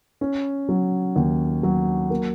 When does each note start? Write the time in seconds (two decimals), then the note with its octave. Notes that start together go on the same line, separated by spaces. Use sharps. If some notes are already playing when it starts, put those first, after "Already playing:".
0.21 C#4
0.69 F#3
1.16 D#2
1.63 F#3
2.10 A#3